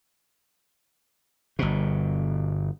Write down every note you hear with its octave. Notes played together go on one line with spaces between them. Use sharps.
G1 B2